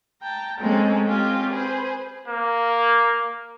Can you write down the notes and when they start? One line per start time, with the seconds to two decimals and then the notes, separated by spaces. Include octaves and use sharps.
0.22 G5 A5 A#5
0.59 G#3 A#3 C4 C#4 A4
1.06 C4 C#4 F4 G4
1.51 G#4 B4 C5
2.27 A#3